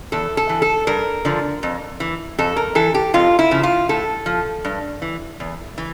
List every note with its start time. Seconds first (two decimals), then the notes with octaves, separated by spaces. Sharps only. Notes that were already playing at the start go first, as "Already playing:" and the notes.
0.12 E2 A4
0.37 A4
0.49 E3
0.62 A4
0.87 G2 A#4
1.25 D3 F3
1.63 F2
2.00 E3
2.38 F2 A4
2.56 A#4
2.75 E3 A4
2.94 G4
3.14 F2 F4
3.39 E4
3.51 C#3 F3
3.63 F4
3.89 A2 A4
4.26 F3
4.65 G2
5.02 E3
5.40 E2
5.78 E3